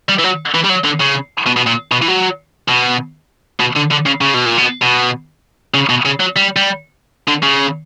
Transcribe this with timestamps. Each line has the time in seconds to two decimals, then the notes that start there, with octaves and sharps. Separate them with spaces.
0.09 G3
0.18 E3
0.24 F#3
0.55 E3
0.65 G3
0.70 F#3
0.85 D3
1.01 C#3
1.47 B2
1.57 B2
1.67 A#2
1.92 B2
2.02 E3
2.08 F#3
2.69 B2
3.60 B2
3.76 D3
3.91 D3
4.06 C#3
4.21 C#3
4.34 B2
4.46 A#2
4.58 B2
4.82 B2
5.74 C#3
5.89 B2
6.05 C#3
6.20 F#3
6.36 G3
6.56 G3
7.28 D3
7.42 C#3